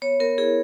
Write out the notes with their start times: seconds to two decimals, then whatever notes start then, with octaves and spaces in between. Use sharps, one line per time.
0.02 B3 C#5
0.20 B3 A#4
0.38 E4 G#4